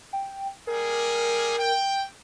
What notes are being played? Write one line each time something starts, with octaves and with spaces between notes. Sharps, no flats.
G5
G3 A#3 G#4 A#4
G5